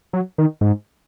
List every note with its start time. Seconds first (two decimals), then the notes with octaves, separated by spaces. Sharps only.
0.13 F#3
0.38 D#3
0.61 G#2